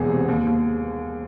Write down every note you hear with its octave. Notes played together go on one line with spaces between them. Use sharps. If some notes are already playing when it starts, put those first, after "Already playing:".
Already playing: E1 E2 G#4
C3
D#2
D#2